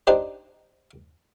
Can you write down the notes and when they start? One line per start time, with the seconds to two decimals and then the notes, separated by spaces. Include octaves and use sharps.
0.07 D4 D#4 G4 C5